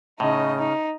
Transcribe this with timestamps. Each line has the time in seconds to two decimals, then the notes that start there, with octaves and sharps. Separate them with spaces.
0.20 A2 C#3 D#4 D#5
0.58 D#4